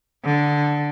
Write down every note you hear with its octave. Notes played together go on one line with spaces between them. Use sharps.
D3